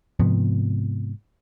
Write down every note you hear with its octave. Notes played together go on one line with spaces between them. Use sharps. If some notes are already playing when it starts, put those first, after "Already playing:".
G#2 C3 F3 B3